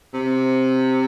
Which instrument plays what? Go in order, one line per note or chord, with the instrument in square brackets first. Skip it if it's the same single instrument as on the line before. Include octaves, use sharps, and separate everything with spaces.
[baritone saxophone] C3